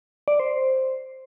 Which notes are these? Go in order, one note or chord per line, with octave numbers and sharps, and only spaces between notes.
D5
C5